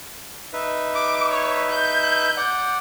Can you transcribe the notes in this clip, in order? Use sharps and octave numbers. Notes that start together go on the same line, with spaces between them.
D#4 B4 E5
D6
C#5
G6
D5 F#5